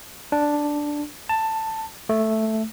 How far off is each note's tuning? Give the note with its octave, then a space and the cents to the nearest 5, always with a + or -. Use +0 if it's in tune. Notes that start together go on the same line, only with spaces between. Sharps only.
D4 +0
A5 +10
A3 +0